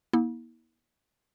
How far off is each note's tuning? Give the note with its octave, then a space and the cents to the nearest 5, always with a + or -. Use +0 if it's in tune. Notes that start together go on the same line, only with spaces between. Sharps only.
A#3 +40 E4 -40